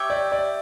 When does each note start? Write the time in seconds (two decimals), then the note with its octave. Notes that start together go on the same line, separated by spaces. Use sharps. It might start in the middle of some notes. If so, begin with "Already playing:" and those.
Already playing: G4 C#5 E5 G5
0.10 D5
0.32 D5